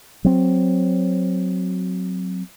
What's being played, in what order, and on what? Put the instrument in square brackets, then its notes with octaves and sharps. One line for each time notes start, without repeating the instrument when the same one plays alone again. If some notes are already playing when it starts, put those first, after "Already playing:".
[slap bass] F#3 C4